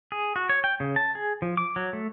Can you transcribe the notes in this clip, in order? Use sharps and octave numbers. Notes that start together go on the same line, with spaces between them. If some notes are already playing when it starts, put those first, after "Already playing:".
G#4
F#4
C#5
G5
C#3
A5
G#4
F3
D6
F#3
A3